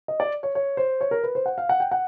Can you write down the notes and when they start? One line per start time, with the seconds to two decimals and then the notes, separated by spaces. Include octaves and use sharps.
0.08 D#5
0.20 D5
0.43 C#5
0.55 C#5
0.77 C5
1.01 C#5
1.11 A#4
1.24 B4
1.35 C5
1.46 F#5
1.58 F5
1.69 F#5
1.80 G5
1.92 F#5